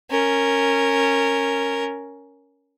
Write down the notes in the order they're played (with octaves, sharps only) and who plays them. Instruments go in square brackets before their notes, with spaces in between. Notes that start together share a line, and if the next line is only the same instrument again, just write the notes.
[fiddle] C#4 A#4